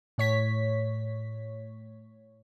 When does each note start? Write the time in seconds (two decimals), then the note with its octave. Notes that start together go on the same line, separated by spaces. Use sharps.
0.18 A2 C#5 B6